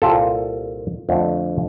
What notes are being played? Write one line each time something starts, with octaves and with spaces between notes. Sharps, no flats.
C2 A#2 G3 F4 A4
F2 D3 A3 D4